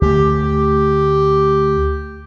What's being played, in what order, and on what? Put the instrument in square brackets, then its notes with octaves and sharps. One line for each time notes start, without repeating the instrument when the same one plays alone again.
[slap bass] D2 A3 [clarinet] G4